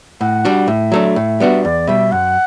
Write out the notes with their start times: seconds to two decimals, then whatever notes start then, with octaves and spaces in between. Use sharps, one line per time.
0.21 A2 F#5
0.45 G3 D4 F#4
0.68 A2 E5
0.92 F#3 A3 D4
1.16 A2
1.40 G3 B3 D4 F#4
1.64 E2 D5
1.87 B2 G3 E5
2.12 F#2 F#5